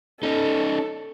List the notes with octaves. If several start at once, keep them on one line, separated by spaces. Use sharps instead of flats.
C#4 D#4 A4